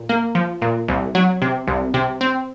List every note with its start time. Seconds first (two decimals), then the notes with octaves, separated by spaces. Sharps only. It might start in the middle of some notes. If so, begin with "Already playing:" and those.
Already playing: A#2
0.09 A#3
0.35 F3
0.62 A#2
0.88 C2
1.15 F#3
1.42 C3
1.67 C2
1.94 C3
2.21 C4